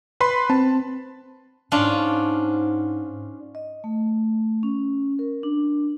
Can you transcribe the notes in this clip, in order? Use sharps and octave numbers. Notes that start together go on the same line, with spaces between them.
B4 B5 C6
C4 A5
G#2 C#4 D4 F4
D#5
A3
C#4
A#4
D4